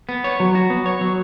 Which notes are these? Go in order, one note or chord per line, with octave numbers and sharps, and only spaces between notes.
B3
C#5
F#3
F#4
B3
C#5
F#3